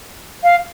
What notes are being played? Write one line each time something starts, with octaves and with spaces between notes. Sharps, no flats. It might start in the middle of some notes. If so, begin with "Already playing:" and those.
F5